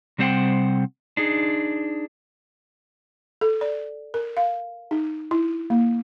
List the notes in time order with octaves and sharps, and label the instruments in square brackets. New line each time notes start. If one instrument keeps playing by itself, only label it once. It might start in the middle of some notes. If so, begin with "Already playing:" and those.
[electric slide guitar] C3 G3 C4 C5 F#5 G5
D4 D#4 G#4
[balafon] A4
D5
A#4
F5
D#4
E4
A#3